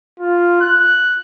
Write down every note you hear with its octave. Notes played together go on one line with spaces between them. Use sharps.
F4
F#6